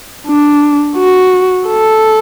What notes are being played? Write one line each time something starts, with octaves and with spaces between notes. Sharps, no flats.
D4
F#4
A4